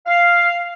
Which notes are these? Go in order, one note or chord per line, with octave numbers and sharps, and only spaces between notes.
F5